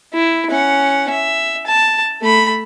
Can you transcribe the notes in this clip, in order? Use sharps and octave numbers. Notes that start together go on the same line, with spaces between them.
E4
C#4 F#5
E5
A5
A3 B5